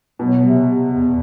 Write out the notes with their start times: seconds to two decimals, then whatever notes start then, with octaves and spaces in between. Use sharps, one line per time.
0.19 B2 F#3
0.44 C3
0.68 C3
0.92 E2